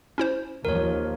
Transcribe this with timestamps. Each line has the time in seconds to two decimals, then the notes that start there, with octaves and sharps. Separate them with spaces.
0.18 C#4 E4 C5
0.65 D#2 F3 A#4 C#5